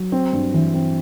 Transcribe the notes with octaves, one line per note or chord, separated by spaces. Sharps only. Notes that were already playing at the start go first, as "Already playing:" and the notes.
Already playing: F#3
C4
G2
E3
C4